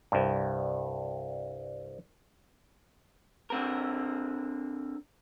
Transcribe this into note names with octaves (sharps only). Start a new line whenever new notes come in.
C2 G2
D3 C4 A#4